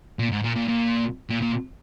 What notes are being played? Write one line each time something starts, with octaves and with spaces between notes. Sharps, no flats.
A#2
G#2
A#2
A#2
A#2
A#2
A#2